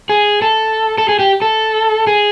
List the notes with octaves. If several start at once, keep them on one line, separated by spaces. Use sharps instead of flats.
G#4
A4
A4
G#4
G4
A4
G#4